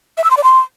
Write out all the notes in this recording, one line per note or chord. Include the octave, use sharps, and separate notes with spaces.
E5
E6
C6
D5
C6